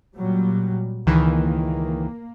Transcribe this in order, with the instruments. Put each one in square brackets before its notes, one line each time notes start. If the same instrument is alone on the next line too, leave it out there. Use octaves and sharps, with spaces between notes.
[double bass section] A#2 F#3 G3
[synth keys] C#2 D#3 E3 [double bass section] A#3